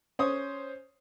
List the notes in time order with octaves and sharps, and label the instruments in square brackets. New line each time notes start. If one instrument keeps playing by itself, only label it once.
[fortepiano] C#4 C5 C#5 D#6